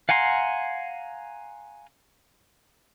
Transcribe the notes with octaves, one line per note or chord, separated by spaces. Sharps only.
F5 F#5 G#5 A#5 C6